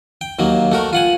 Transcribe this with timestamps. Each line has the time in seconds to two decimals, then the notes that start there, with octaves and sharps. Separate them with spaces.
0.21 G5
0.39 D#2 F#3 A#3
0.72 A3 F#4 A#4
0.93 F4 F#5 G#5